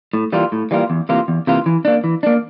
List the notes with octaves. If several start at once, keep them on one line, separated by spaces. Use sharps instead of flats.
A2
E3 G3 A#3 F4
A2
E3 G3 A#3 F4
E2
C3 E3 A#3 F4
E2
C3 E3 A#3 F4
E3
A#3 D4
E3
A#3 D4